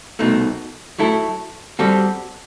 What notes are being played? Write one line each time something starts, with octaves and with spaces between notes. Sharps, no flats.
C2 B2 A3 D#4
F#3 A3 E4 A4
G3 C4 F#4 A4